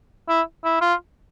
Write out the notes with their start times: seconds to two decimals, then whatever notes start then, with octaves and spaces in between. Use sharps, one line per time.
0.29 E4
0.65 E4
0.81 F4